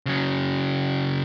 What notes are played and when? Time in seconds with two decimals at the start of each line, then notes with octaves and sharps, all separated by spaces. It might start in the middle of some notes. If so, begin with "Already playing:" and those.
0.06 C#3 F#3